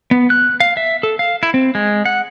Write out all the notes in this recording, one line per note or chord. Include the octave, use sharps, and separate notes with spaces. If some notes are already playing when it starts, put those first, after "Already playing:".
B3
F#6
F5
E5
A4
F5
E4
C4
G#3
F#5